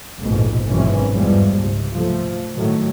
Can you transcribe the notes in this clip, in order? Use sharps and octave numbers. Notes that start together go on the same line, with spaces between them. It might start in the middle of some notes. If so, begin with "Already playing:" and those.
F1 A#1 F2 G#2 B2
G#1 F#2 B2 E3 C4 C#4
E2 G2 E3 F3 G3 G#3
C#2 G#2 C3
F3 A3
A2 D#3 F#3